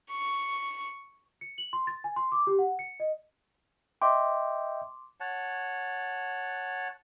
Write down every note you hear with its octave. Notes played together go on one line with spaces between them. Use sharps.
C#6
C#7
F#7
C6
A6
G#5
C6
D6
G4
F#5
C#7
D#5
D#5 E5 G5 C6 D6
C#5 F#5 A5